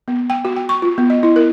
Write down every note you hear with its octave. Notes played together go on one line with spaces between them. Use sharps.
B3
G5
F#4
G5
C#6
F4
B3
D#5
E4
A#4